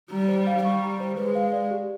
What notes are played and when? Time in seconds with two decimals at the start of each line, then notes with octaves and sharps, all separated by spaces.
0.11 G3 A#5
0.28 C5
0.47 F5
0.64 G3 C#6
0.82 A#5
1.00 C5
1.17 G#3 B4
1.35 F5
1.52 D5
1.71 G4